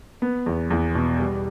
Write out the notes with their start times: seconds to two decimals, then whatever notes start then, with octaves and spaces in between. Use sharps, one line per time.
0.22 B3
0.46 E2
0.70 E2
0.95 B2
1.19 G3